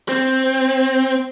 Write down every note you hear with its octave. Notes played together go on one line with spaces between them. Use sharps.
C4